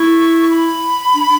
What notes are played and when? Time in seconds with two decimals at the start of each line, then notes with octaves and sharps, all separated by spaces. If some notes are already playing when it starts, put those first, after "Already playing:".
Already playing: E4 C#6
0.51 B5
1.15 D4